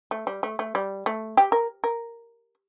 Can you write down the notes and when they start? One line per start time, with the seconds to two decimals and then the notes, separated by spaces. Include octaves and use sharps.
0.11 A3
0.27 G3
0.43 A3
0.59 A3
0.75 G3
1.06 A3
1.37 G4
1.52 A#4
1.84 A#4